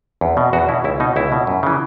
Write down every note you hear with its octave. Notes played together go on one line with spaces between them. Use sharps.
E2
B2
E2 F#4
B2 E4
C#2 E4
B2 D#4
C#2 E4
B2
F#2
C#3 E3